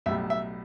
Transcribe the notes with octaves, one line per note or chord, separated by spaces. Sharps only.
B1 A2 G3 E5
E5